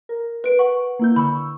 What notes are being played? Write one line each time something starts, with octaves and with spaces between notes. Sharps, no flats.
A#4
B4 D7
F#5 C#6
A#3 E4 G6
D3 B5 C#6 E6